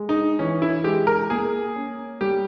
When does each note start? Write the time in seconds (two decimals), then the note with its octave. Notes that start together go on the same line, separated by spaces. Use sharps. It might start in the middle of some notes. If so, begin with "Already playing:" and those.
Already playing: G#3
0.09 D#4
0.39 E3 C#4
0.62 E4
0.84 G#3 G4
1.07 A#4
1.30 A#3 G#4
1.76 C#4
2.21 G3 G4